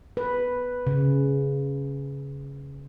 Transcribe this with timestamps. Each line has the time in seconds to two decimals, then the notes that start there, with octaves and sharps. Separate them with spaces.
0.17 B4
0.87 C#3